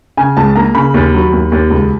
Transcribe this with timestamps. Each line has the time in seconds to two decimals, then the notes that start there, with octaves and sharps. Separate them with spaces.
0.17 C#3 G#5
0.37 C#2 A5
0.56 A#3 A#5
0.75 C#3 B5
0.94 D#2
1.14 F#3
1.32 D#2
1.52 D#2
1.70 C#2